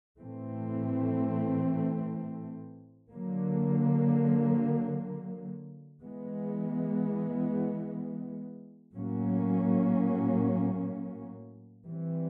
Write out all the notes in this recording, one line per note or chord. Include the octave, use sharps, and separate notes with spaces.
A2 E3 A3 C4
D3 F#3 A#3
E3 G#3 B3
A2 F#3 A#3 C#4
E3 G3 C4